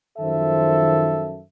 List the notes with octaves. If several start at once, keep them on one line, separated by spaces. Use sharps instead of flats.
F#2 D#3 F3 A4 C5 E5